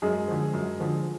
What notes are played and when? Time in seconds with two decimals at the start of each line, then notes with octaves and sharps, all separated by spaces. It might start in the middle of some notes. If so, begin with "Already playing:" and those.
0.02 F#2 G#3 G#4
0.28 D3 F3
0.53 F#2
0.80 D3 F3